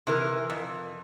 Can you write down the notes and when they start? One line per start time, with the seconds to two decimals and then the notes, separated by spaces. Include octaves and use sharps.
0.07 C3 E3 A#4
0.50 F2